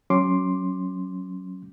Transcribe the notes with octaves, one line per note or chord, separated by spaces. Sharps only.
F#3 C#4 C6 D6